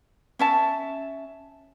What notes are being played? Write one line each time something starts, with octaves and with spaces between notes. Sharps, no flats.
C#4 E5 A5